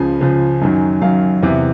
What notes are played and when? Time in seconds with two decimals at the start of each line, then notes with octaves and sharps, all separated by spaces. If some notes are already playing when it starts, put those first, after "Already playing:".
Already playing: C#2 C#3 F3 G#5
0.21 C#2 C#3 F3
0.61 F#2 D#3 F#3
1.01 F#2 D#3 F#3 F5
1.43 E2 C3 E3